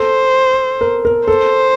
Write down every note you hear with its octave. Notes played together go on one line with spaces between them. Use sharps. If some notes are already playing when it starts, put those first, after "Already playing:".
Already playing: A4 C5
A#4
A#4
A4 C5